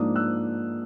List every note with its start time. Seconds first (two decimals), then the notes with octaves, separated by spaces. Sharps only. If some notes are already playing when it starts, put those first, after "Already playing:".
Already playing: G#2 F3 A#3 D4 D#6
0.15 E6 F#6